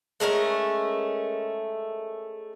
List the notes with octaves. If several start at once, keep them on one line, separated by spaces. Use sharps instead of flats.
G#3 A3 C#4 A#4